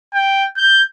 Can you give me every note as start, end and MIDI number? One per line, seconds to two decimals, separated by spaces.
0.14 0.46 79
0.57 0.83 91